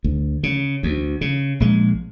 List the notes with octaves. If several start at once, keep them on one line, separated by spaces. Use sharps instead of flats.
D2
C#3
D2
C#3
A#1 G#3